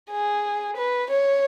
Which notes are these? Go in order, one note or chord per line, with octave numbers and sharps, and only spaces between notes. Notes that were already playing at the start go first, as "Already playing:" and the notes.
G#4
B4
C#5